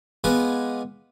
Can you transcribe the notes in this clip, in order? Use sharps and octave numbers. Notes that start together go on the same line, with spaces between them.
G#3 B3 F4 B4 G#5 D6